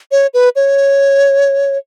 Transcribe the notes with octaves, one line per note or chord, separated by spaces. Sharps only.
C#5
B4
C#5